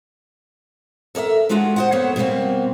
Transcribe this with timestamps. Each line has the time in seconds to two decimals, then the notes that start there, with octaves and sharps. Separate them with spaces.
1.15 A4 A#4 D5 E5
1.49 G#3 C#4 D4 F4 F#4
1.76 C5 D#5 F#5
1.92 F2 A#3 B3 C5 C#5 F#5
2.16 B2 G3 G#3 A#3 C4